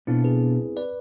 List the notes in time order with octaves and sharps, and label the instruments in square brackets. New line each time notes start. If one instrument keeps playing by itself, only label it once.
[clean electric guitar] B2 B3 D4 F4 A4 [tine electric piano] C4 E4
[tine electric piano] G#4 B4
B4 D5